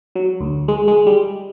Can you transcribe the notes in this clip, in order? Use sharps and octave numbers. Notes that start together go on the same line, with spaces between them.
F#3
D2
G#3
G#3
G3